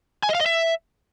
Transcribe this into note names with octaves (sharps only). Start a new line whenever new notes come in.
G#5
D#5
F5
D#5
E5